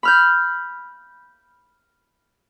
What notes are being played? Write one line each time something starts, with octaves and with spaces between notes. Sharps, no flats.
B5 F6 G6